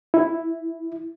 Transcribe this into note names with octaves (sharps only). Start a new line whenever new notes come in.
E4